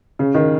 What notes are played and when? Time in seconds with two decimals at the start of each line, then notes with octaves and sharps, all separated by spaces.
0.19 C#3
0.34 D#3